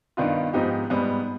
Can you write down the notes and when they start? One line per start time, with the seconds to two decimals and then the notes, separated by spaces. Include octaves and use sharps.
0.17 G2 D#3 B3 D4 F4
0.53 G#2 F3 B3 D#4 G4
0.90 G#2 G3 B3